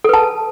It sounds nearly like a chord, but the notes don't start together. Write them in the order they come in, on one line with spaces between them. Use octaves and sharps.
A4 B4 A5